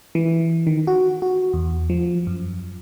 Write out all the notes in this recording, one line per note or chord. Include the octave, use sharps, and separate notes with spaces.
E3
D#3
F#4
F#4
E2
F3
F#2